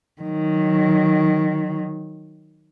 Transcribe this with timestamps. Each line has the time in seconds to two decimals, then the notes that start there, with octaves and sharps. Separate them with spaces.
0.22 D#3 F#3